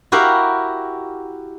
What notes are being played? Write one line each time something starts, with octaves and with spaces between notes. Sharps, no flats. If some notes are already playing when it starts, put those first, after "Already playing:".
E4 F#4 G4 A#4 F5